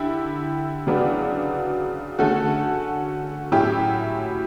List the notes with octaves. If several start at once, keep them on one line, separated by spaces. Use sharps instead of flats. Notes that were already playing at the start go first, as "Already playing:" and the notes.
Already playing: D3 E4 G4
C#3 F#3 B3 D4
D3 A3 C#4 F#4 A4
A2 F#3 C#4 E4 G4